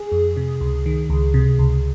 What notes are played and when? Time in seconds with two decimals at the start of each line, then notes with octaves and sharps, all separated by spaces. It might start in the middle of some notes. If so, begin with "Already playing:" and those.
Already playing: G#4
0.12 F2
0.37 C3
0.61 C#2
0.86 D#3
1.10 C#2
1.34 C3
1.59 C#2